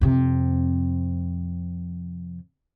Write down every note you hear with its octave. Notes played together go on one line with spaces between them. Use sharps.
F2 C3